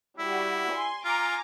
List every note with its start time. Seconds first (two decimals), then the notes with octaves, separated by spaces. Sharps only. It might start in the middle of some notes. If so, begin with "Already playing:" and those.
0.19 G3 E4 F#4
0.72 G#5 C6
1.05 F4 G#5 A#5 D6